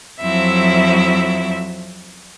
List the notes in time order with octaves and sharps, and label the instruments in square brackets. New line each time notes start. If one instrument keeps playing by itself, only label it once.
[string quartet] F2 F3 F#3 C4 E4 E5